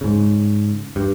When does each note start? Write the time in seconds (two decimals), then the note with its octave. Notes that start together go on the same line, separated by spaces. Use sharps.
0.01 G#2 C#3
0.96 G2